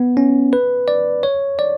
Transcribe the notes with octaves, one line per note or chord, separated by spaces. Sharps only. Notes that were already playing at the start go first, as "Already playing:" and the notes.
Already playing: B3
C#4
B4
D5
C#5
D5